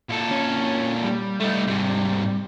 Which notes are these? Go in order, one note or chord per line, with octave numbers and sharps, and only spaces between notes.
A#2 A4
C#4
G3
A3 D#4
G#2 C3